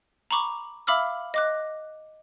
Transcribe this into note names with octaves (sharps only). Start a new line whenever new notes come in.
A#5 B5 C#6 D6
E5 F5 B5 D6 E6 F6
D#5 D6 F#6